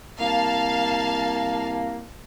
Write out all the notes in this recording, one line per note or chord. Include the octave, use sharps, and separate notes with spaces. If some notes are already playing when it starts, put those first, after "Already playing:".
C2 A#3 F5 A5